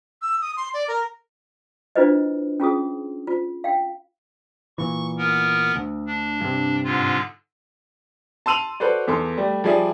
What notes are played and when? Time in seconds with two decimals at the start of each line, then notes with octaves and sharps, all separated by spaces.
0.22 E6
0.41 D#6
0.57 C6
0.74 D5
0.88 A#4
1.96 D4 E4 F4 B4 C5 D#5
2.60 C#4 F4 G#4 D#6
3.27 F4
3.64 F5 G5
4.78 A#2 E3 C#6
5.18 B3 A#4
5.76 D2
6.07 D4
6.41 G2 C3
6.84 G#2 D3 F4
8.46 A5 C6 E6 D#7 F7 F#7
8.80 F#4 A4 B4 C5 D5
9.07 E2 A4 C6
9.37 G3 A3
9.64 F3 G3 G#4 D5 E5